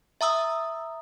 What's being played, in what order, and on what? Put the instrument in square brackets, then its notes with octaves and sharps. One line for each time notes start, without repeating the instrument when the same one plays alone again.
[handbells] E5 A#5 D#6 E6